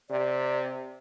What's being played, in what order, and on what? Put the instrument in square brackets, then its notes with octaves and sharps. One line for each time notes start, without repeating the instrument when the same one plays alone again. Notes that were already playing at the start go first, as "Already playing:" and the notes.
[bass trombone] C3 [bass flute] D5